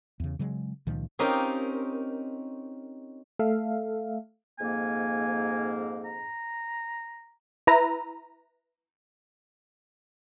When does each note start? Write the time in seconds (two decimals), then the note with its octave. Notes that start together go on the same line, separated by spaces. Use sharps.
0.20 E2 C#3
0.39 C#3 F#3 G#3
0.87 C#2 A#2 D#3 F3
1.19 C4 C#4 D#4 F4 G4 A#4
3.39 A3 A4 E5 F5
4.59 F2 G#2 A#3 G#5
6.05 A#5
7.67 E4 B4 A#5